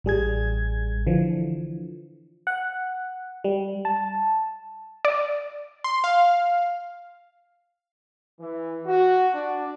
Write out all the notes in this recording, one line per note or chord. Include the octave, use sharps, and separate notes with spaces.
A1 G3 G#4 G#6
D3 E3 F3
F#5
G3
A5
D5
C6
F5
E3
F#4
D4